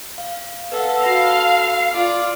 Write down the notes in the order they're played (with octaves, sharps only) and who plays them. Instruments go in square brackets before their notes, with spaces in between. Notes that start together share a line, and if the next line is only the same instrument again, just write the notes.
[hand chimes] F5
[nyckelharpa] A4 [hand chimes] B4 F5 F#5
[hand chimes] F#4 B5 A#6 [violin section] F5
[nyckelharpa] F4 D5